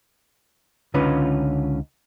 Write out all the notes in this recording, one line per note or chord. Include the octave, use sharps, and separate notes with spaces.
C#2 D3 C#4 D#4 F4 B4